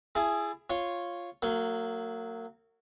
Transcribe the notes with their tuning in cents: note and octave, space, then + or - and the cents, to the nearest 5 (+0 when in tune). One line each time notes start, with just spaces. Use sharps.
E4 +30 G#4 +0 A5 +0
F4 +0 C#5 -5
F#3 +0 A#3 -35